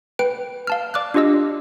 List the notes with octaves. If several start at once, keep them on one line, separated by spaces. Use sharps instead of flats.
B4 G5 F#6 D7
F5 A5 F6
D5 D6 F6 F#6
D4 F4 G4 D#5 E6